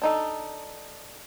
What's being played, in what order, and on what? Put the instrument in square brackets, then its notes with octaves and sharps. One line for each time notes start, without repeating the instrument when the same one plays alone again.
[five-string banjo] D4 D#4 A4